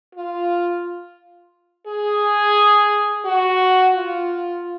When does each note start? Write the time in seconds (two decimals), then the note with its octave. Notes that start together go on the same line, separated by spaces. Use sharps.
0.15 F4
1.87 G#4
3.25 F#4
3.94 F4